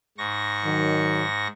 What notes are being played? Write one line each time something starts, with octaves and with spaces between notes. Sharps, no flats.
G#2 C#6 A#6
D#3 F#3